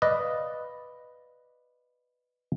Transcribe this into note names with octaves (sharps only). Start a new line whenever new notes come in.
B4 D5 D#5 F5